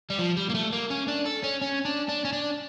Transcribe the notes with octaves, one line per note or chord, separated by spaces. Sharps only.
G3
F3
G3
A#3
A3
A#3
C#4
D4
A4
C#4
C#4
D4
D4
C#4
D4